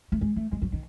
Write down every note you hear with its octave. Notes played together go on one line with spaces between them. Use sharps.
A3
G#3
A3
G#3
F#3
D#3